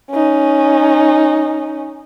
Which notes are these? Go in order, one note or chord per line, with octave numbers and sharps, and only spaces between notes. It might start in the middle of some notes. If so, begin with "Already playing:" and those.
C#4 D#4